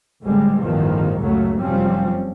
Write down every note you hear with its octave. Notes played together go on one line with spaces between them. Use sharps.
A#1 A2 D3 G3 G#3 C4
A1 E2 G2 D#3 F3
C#2 F#2 C#3 F#3 A3
F1 F#2 F3 G3 C4 C#4